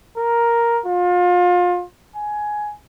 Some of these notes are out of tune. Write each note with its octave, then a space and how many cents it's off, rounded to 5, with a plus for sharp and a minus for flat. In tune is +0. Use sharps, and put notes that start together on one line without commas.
A#4 +5
F4 +30
G#5 +10